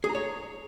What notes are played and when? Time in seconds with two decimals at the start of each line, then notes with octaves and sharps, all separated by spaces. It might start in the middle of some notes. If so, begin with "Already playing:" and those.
0.04 G#4
0.09 A#5
0.15 C#5